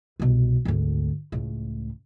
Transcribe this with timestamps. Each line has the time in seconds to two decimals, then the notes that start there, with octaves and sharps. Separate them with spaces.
0.20 C2 B2
0.65 G#1 D2
1.32 C#2 A2